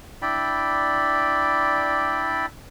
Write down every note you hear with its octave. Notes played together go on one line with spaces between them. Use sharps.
D4 E4 D5 G5 B5